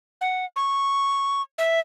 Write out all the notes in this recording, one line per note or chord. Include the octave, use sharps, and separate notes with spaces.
F#5
C#6
E5